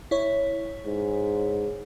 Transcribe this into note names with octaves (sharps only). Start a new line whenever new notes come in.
E4 C#5
G#2